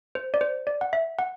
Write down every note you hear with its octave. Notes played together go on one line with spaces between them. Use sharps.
C5
D5
C5
D5
F#5
E5
F#5